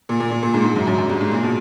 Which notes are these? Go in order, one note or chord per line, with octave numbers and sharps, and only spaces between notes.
A#2
A#2
A#2
A#2
G#2
G#2
F#2
F#2
F#2
G2
G#2
A#2
B2